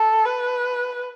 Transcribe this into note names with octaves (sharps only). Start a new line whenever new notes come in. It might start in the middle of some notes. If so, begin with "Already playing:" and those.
Already playing: A4
B4